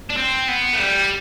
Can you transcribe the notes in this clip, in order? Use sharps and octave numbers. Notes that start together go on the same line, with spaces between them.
D4
C4
B3
A3
G3